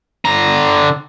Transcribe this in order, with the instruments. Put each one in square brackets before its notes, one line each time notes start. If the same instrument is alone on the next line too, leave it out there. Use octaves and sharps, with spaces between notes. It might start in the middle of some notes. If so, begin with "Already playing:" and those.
[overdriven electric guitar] D3 A#5